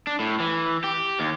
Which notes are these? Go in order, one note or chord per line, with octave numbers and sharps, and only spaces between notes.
D4
A2
E3
G4
D#2